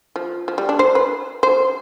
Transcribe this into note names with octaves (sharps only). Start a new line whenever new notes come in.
F3
F3
G3
D4
C5
B4
C5